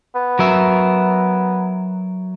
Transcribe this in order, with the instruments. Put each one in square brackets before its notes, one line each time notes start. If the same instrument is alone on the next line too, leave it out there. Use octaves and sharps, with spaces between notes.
[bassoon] B3
[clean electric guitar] F#3 A#4 E5